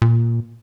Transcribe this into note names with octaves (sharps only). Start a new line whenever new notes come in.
A#2